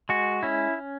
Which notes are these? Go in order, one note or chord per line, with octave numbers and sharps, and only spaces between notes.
G#3 F#4
C#4 E4